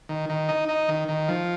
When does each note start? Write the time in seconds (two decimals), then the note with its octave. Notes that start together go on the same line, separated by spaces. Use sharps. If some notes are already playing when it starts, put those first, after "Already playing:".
0.09 D#3
0.29 D#3
0.49 D#4
0.68 D#4
0.88 D#3
1.08 D#3
1.28 F3